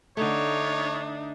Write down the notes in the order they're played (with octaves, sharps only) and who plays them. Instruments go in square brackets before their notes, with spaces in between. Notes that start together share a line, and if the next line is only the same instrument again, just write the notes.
[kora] D3 A3 [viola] D4 D#4 [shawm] C#5